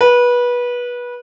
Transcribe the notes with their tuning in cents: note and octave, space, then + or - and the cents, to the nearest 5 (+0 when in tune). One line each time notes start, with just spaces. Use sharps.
B4 -20